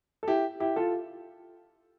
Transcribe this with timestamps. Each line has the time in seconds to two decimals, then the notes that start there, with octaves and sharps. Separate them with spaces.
0.23 A4
0.28 E4 G4
0.60 E4 G4
0.76 F4 A4